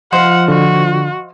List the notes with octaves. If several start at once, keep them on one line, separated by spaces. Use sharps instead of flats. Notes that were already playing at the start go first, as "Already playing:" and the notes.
F3 C5 D#5 F5 F#5
D3 F#4